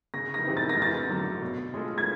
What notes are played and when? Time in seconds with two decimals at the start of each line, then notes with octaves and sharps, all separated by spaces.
0.14 C#3 A#6
0.34 A#6
0.45 E3 G3 C4 D#4
0.57 A6
0.69 A#6
0.77 F2
0.82 A6
1.10 D3 F#3
1.42 B2
1.74 G#3 C#4 F4 A4
1.98 G#6